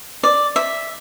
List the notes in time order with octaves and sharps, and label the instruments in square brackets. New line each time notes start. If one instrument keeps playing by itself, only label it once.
[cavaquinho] D5
E5